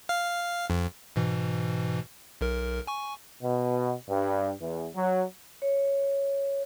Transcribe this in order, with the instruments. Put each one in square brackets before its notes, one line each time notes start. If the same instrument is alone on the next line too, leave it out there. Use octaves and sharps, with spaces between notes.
[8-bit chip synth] F5
F2
G#2 B2 E3
B1 A#4
G#5 C#6
[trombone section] B2
G2
E2
F#3
[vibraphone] C#5